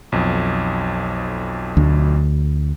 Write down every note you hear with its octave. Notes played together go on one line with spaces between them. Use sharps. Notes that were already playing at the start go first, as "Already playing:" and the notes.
B1 F2
D2